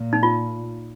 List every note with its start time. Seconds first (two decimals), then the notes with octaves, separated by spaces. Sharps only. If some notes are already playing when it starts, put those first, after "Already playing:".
Already playing: A#2
0.13 D#4
0.23 F4